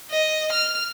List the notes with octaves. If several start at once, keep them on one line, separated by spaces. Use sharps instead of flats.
D#5
F6